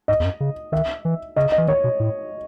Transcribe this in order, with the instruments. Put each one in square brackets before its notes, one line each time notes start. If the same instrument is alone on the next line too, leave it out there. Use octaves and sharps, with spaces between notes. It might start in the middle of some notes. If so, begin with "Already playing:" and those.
[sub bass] G#2 [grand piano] D#5
[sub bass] E2
F#2
C#3
[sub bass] D#3 [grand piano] E5
[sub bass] E3
[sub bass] C#3 [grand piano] D#5
[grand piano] D#5
[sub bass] E3
[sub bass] D#3 [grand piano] C#5
[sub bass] B2
A2